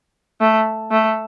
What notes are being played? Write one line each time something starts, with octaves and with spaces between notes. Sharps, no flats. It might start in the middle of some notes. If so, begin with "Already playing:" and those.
A3
A3